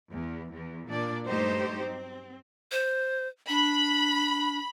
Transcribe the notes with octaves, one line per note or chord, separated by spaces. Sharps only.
E2
E2
A#2 D4 D5
G2 F#3 A3 D#4 G4 C5
C4
C5
D4 B5